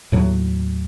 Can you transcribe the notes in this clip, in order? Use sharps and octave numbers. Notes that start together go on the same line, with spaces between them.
D#2 A2 F#3